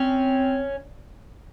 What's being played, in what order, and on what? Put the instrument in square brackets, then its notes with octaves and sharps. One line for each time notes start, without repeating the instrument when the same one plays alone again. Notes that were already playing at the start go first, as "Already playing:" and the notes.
Already playing: [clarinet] C4 [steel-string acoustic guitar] C#4